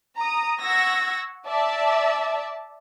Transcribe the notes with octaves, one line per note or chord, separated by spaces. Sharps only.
A#5 D#6
F#5 C#6 E6 G#6 A#6
D5 E5 A5